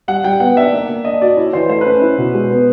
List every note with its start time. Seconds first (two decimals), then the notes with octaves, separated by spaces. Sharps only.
0.08 G3 F#5
0.24 G3 G5
0.40 B3 F#5
0.57 D4 E5
0.72 A#3
0.89 A#3
1.05 D4 D#5
1.21 F#4 D5
1.37 E4 C#5
1.53 E3 C5
1.69 A3 C5
1.81 C#4 B4
2.02 E4
2.18 B2
2.34 G#3
2.51 B3